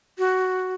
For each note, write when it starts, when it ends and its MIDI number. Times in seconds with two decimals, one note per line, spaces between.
0.18 0.75 66